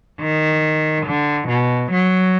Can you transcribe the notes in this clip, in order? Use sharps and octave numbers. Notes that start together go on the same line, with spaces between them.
D#3
D3
B2
F#3